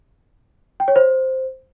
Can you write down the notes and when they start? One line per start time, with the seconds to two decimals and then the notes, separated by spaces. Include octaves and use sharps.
0.80 G5
0.88 C#5
0.96 C5